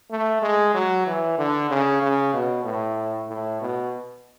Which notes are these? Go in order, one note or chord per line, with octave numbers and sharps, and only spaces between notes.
A3
G#3
F#3
E3
D3
C#3
C#3
B2
A2
A2
B2